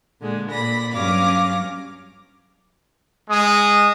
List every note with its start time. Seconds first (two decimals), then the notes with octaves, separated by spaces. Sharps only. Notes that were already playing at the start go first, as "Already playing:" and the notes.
0.20 A#2 D3 G#3
0.50 A#2 D5 B5 A#6
0.92 G2 F#3 C#4 F5 D6 A#6
3.29 G#3 D#6